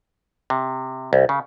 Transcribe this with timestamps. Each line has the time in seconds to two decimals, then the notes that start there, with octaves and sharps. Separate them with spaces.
0.50 C3
1.13 C2
1.29 C#3